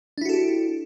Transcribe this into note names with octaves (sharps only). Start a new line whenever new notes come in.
D4 E4 F#4 G4 A4